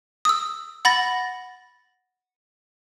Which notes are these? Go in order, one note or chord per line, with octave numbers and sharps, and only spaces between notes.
D#6 E6
F#5 B5 A6 A#6